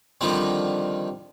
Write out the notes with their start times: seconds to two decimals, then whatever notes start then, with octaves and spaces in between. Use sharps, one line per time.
0.21 D3 D#3 F3 G3 C4